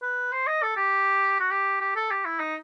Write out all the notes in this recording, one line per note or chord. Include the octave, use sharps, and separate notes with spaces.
B4
C5
D#5
A4
G4
F#4
G4
G4
A4
G4
E4
D#4